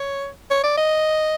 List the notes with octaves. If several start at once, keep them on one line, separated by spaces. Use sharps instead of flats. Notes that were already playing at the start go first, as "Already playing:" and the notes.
Already playing: C#5
C#5
D5
D#5